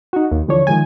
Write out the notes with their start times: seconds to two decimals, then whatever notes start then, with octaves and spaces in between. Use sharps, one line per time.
0.13 D#4 F#4
0.32 D#2
0.48 D3 E3 F3 D4 C#5
0.67 D#3 F3 G#3 G#5